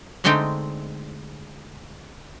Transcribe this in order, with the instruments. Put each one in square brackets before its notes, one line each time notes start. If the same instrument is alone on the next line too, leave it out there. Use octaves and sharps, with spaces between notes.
[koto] D3 G#3 A3 C4 D#4 G5